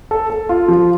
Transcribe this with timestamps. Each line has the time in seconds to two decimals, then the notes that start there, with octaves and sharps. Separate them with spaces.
0.11 A4
0.30 A4
0.49 F4
0.68 F3